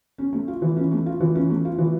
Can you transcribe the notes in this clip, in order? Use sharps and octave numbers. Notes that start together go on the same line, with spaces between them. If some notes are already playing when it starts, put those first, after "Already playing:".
C#4
A3
F4
E3
C#4
A3
F4
E3
C#4
A3
F4
E3